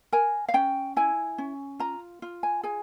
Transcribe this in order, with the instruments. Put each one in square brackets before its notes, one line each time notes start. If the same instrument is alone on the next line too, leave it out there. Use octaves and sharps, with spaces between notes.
[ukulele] A#4 G#5
F5
C#4 G5
E4 G#5
C#4
F4 A#5
F4
G#5
G#4 G#5